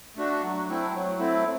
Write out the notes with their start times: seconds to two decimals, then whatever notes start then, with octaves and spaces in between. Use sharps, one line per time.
0.16 A3 D4 F#4
0.42 F#3
0.68 A3 C4 E4
0.94 F#3
1.19 A3 C4 E4